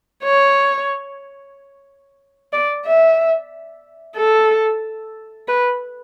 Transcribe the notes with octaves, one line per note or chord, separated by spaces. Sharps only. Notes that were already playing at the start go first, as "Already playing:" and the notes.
C#5
D5
E5
A4
B4